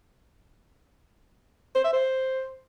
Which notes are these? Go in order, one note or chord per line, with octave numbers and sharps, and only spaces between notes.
C5
E5
C5